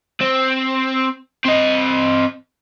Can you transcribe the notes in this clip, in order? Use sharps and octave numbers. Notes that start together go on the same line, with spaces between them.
C4
C4 D#5